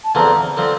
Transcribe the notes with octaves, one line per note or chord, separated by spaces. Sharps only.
A5
E2 D3 F3 C4 A#5
D3 F3 C4